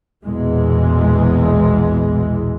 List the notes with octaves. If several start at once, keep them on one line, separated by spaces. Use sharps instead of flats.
A#1 E2 B2 E3 G#3